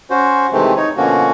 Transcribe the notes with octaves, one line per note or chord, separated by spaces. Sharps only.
C#4 F#4 C5
C3 D#3 E3 G#3 A3 C4
D#4 C#5
B2 D3 F3 A#3 C#4 F#4